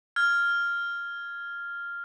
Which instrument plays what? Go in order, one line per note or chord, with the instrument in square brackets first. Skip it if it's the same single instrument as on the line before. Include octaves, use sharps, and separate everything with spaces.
[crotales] F6 G#6